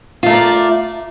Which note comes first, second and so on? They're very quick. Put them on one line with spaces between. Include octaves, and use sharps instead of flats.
F4 A3 A#4 D5